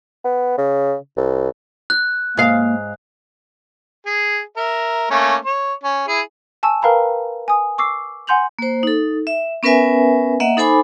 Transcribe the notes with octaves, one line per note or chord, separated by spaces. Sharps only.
B3
C#3
C2
F#6
G#2 A#3 F5
G#4
A#4 E5
A3 A#3 C#4
C#5
C#4
E4 G#4
G#5 A5 C#6 E6
A#4 B4 F5 G5 A#5 B5
G#5 D#6
C#6 D6 E6 C7
F#5 G#5 C6 G6 F7 F#7
A#3 C5
D#4 A4
E5
B3 C#4 A#4 B4 E5 G#5
A#3 D#5 E5 F#5
D#4 A4 C5 G#5 B5 D6